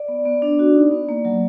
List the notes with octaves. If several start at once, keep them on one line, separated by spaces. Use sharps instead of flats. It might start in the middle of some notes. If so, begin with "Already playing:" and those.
Already playing: D5
B3
B3
D4
F#4
D#4
B3
A#3
F#3